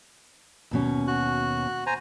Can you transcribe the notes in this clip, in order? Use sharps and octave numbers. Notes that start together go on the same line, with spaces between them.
D#2 B2 C#4
F#4 F#6
C5 G#5 A#5